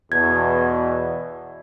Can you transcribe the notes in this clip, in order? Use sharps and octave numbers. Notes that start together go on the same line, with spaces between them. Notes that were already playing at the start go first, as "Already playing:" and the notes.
E2 B2 G#6